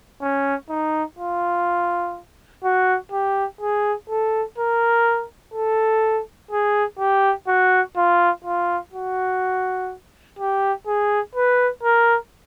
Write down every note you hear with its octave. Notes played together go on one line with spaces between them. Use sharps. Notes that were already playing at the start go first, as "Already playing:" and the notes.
C#4
D#4
F4
F#4
G4
G#4
A4
A#4
A4
G#4
G4
F#4
F4
F4
F#4
G4
G#4
B4
A#4